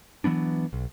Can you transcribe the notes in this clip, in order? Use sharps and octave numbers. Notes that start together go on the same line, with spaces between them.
E3 F#3 B3 D4
B1